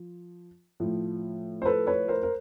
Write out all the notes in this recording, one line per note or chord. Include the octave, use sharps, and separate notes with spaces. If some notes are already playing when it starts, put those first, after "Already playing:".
Already playing: F3
A2 F3
C5
A4 B4
B4 C#5
A#4 C5
A#4